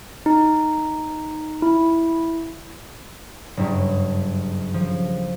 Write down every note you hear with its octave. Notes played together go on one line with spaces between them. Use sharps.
D#4
E4
F#1 G2
F3